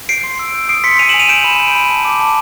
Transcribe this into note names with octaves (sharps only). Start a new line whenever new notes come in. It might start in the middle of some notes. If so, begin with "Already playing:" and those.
G6 C7 D7
C6
E6
G6
D#6 C7 D7
C6 B6 C#7
G#5 D#7 F7
E7 F#7
G#5
D#7 F7
G6 D7 E7
B5
G6
B5
A5
D6
A5